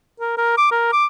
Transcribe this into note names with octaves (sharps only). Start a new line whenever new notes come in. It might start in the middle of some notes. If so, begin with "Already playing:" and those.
A#4
A#4
D6
A#4
D6